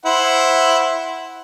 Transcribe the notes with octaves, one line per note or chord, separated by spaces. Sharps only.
E4 C5 F#5